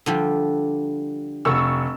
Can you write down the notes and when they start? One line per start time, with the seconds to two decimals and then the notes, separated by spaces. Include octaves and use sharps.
0.06 D3 F3 G3
1.45 F1 C#6 E6